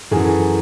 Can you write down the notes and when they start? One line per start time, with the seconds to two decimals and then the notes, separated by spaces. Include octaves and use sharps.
0.11 F#2 G#4
0.15 E3 A4
0.27 G#4